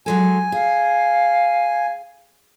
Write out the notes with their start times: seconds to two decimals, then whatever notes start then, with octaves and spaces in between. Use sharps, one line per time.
0.06 F#3 G#3 A4 G#5
0.52 G#4 F5